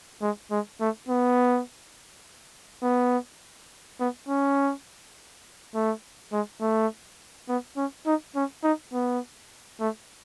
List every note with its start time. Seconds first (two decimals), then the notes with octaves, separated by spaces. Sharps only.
0.22 G#3
0.51 G#3
0.81 A3
1.09 B3
2.83 B3
4.00 B3
4.29 C#4
5.74 A3
6.32 G#3
6.61 A3
7.49 B3
7.77 C#4
8.06 D#4
8.36 C#4
8.64 D#4
8.93 B3
9.80 A3